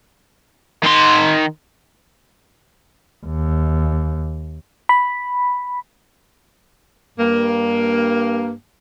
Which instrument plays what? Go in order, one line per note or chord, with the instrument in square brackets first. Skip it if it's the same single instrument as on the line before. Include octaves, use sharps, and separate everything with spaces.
[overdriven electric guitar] D#3 C6
[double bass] D#2
[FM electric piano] B5
[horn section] G2 A#3